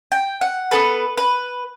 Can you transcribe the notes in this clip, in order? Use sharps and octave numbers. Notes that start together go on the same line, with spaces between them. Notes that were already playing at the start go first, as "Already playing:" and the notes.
G5
F#5
B3 D4 A4 B4
B4